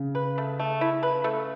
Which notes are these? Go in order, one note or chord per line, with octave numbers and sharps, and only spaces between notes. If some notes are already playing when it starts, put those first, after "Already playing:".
Already playing: C#3
B4
A3
A3
E4
B4
A3